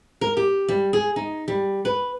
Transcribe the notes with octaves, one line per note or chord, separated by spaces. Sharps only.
A#4
G4
G3
G#4
D#4
G3
B4